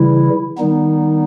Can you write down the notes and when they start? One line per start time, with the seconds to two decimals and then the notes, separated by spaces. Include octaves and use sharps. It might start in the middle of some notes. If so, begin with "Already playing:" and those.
Already playing: C#3 E3 G3 E4
0.58 D#3 G3 B3 D#4